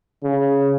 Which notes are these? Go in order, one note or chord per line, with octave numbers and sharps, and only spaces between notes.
C#3